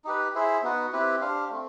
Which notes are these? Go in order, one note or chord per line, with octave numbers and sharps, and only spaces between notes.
D#4 G4 B4
E4 G#4 C5 E5
B3 D#4 F#4 B4
C4 E4 G4 B4
D4 G4 C5 F5
A3 C4